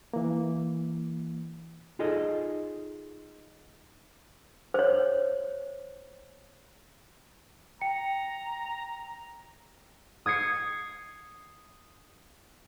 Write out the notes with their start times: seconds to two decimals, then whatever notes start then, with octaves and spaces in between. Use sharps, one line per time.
0.14 E3 A#3
1.99 D#4 F4 G#4 A4 D#5
4.74 C5 C#5
7.81 G5 A#5 C#7
10.26 D#6 G#6 C7 C#7